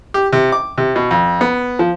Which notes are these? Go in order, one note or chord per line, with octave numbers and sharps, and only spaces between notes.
G4
C3
D6
C3
B2
F2
B3
F3